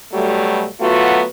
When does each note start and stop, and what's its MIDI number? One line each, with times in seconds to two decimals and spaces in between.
0.13 0.66 47
0.13 0.66 54
0.13 0.66 55
0.13 0.66 57
0.80 1.24 54
0.80 1.24 57
0.80 1.24 59
0.80 1.24 65
0.80 1.24 66